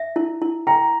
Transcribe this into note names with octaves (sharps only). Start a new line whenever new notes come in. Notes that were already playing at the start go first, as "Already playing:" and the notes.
Already playing: E5
E4
E4
G5 A#5